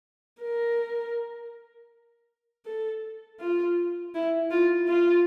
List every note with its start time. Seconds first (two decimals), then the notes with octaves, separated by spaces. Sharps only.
0.42 A#4
2.66 A4
3.40 F4
4.14 E4
4.51 F4
4.88 F4